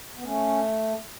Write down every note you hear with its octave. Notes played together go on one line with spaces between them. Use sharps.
B3
A3 C#4